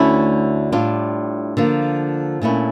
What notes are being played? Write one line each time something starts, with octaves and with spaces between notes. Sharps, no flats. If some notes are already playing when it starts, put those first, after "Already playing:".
Already playing: D2 D3 A3 C#4 E4
A2 G3 D4 F4
D3 F3 A#3
A#2 A3 C#4 E4